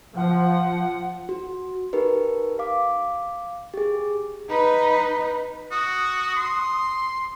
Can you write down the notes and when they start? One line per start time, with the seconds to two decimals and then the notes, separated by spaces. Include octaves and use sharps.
0.17 F3 F#5
1.29 F#4
1.93 D#4 G4 A#4 B4
2.59 F5 D6
3.74 G4 G#4
4.49 D#4 B4
5.71 F#4 D#6
6.36 C6